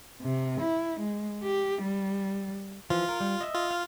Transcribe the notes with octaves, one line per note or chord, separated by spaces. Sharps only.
C3
E4
G#3
G4
G3
E3 F3 F4
A#4
G3
D#5 E5
F4
F5